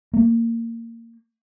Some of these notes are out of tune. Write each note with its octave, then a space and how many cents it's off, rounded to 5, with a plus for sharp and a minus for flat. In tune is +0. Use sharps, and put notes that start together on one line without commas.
A#3 -20